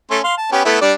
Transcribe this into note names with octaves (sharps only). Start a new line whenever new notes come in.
A3 C#4 C6
F5 C6
A5
B3 C#4 G4
A3 B3 E4
G3 D4 D5